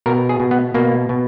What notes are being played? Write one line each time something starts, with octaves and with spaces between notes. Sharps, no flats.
B2 A#4
G#4
B2
B3
B2 A#3
B2